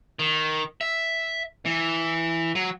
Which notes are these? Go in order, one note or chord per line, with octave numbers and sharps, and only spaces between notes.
D#3
E5
E3
F#3